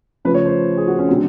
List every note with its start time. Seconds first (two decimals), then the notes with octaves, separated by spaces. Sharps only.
0.25 C#3 F3 A3 B4
0.34 C#5
0.46 C5
0.77 G#4
0.88 F#4
0.99 C#4
1.08 D3 F#3 A3 C4